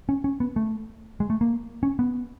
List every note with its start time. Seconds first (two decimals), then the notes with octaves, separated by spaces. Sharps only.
0.09 C#4
0.24 C#4
0.40 B3
0.56 A3
1.20 G#3
1.30 A3
1.41 A#3
1.83 C#4
1.99 B3